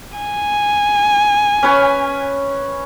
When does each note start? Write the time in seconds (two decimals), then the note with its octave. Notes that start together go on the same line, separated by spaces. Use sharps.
0.18 G#5
1.63 C#4 B4 C#5